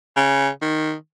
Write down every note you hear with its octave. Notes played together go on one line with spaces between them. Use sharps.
C#3
D#3